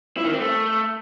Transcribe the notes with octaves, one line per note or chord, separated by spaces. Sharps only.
E4
D#3
C4
A3